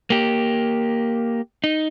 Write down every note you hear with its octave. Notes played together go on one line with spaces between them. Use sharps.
A#3 G4
D#4